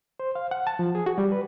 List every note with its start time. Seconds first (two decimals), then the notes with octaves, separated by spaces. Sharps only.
0.20 C5
0.35 F5
0.51 F#5
0.67 A5
0.79 F3
0.95 G#4
1.06 F#4
1.18 G3
1.32 B4